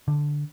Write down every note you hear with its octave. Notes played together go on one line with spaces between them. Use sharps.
D3